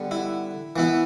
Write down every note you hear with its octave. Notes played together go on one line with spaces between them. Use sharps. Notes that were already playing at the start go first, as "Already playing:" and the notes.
Already playing: D3 G3 B3
E4
E3 B3 E4